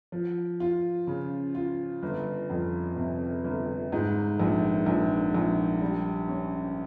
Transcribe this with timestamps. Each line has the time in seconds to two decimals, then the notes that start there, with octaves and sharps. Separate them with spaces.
0.12 F3
0.60 F4
1.07 C#3
1.55 F4
2.03 G1
2.50 F2
2.97 C3
3.45 G1
3.92 G#2
4.39 A#1
4.86 A#1
5.34 A#1
5.81 G3
6.29 C#4